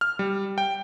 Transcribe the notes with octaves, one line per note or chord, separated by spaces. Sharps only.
F6
G3
G5